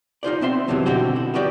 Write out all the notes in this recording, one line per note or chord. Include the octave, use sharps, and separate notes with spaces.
D#4 F4 C5 D5
B3 C4 E5 C6
E2 G2 C3 D#3 E3 F#3
B2 D3 C4 F#4 G4
E4
B3 C#4 F#4 G4 D5